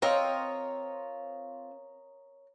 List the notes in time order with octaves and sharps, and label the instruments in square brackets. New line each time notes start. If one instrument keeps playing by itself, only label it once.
[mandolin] C4 F4 [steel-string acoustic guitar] A#4 C#5 D#5